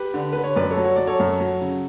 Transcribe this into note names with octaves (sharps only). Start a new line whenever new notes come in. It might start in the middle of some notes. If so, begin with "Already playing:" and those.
Already playing: G4 B4
D3
D3 B4
C#5
F#2 B4 D5
A4 C#5
F#3
C#5
F#3 D5
A4 C#5
F#2
F#3
C#3